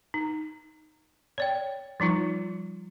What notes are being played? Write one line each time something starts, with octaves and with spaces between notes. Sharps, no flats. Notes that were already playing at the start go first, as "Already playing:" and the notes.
D#4
C#5 D5 G5
F3 G3 D#4 F4